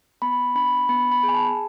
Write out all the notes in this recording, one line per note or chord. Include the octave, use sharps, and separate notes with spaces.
B3 B5
D4 B5
B3 B5
B5
G#4
G#5
A5